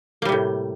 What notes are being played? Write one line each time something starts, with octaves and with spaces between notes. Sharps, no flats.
A2 C3 G3 A#3